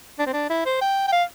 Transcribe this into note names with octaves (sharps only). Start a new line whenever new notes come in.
D4
C4
D4
E4
C5
G5
G5
F5